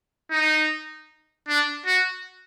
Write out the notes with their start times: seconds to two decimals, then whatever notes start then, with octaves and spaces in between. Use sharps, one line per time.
0.31 D#4
1.48 D4
1.86 F#4